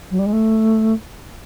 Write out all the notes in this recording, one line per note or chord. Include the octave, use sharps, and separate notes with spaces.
F#3
G3
G#3
A3